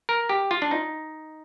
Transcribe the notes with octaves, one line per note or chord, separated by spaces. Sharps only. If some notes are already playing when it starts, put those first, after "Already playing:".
A#4
G4
F4
D4
D#4